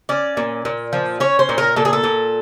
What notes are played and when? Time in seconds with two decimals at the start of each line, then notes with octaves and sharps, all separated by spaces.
0.09 C#4 D5
0.37 A#2
0.65 A#2
0.93 F3
1.20 C#4 C#5
1.39 C5
1.49 A#2
1.58 A#4
1.76 A#2 A4
1.85 G#4
1.93 A4
2.04 A#2